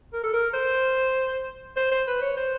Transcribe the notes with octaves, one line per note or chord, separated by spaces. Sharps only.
A#4
A4
A#4
C5
C5
C5
B4
C#5
C5